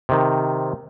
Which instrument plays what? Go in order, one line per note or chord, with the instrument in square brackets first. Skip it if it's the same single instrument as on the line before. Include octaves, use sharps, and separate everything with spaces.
[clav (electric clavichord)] C3 D#3